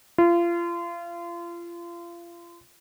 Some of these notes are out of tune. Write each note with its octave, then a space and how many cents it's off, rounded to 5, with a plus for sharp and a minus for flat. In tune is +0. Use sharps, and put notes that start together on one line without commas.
F4 -30